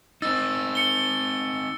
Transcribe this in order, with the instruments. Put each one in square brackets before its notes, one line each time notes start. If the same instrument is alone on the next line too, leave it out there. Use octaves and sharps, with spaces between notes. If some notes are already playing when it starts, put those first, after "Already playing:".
[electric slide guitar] C4 D#4 [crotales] E6 A6
[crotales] C#7 G7